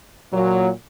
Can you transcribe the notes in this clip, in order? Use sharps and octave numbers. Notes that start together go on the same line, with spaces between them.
A#2 F#3